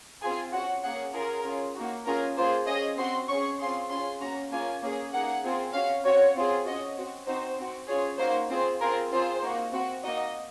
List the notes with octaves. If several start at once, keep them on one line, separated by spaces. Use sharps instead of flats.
C4 F4 G#4 G#5
C#4 F#4 F#5
A#3 C#4 G#4 F#5
C#4 F4 G#4 A#4
C#4 F4 G#4
A#3 D#4 F#4
C#4 F4 G#4 A#4
A#3 F4 G#4 C5
C#4 G#4 D#5
C4 F#4 C6
C#4 G#4 C#6
C4 F4 G#4 C6
C#4 F4 G#4 C6
A#3 C#4 F#4 A#5
A#3 C#4 F4 G#4 G#5
A#3 C#4 G#4
A#3 D#4 G#4 F#5
C4 F4 G#4
C#4 F#4 F5
C4 F#4 C#5
C4 F4 G#4
C#4 F#4 D#5
C4 F#4
C4 D#4 F#4 C5
C4 F#4
C#4 F4 G#4 C#5
A#3 D#4 F#4 C5
C4 F4 G#4 C5
C4 F4 G#4 A#4
C4 F4 G#4 C5
A#3 D#4 F#4
C4 F#4
A#3 D#4 F#4 D#5